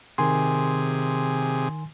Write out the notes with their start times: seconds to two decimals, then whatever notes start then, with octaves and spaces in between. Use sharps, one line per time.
0.18 C3 D#3 G#4 G#5 C6